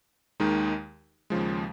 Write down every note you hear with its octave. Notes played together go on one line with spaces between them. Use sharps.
D#2 D#3 G#3 D#4
D#2 C#3 F3 G#3